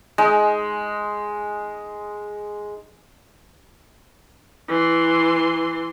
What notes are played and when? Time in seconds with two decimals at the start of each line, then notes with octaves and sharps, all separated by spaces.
0.18 G#3 D#4
4.69 E3 C6